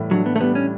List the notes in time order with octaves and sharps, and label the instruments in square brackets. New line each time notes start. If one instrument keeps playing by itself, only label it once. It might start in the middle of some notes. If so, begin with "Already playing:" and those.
Already playing: [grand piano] A2 E3 G3
[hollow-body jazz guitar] F#3 [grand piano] D4
[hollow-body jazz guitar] B3
A3
[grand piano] G3 [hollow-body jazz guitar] B3
[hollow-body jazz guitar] C#4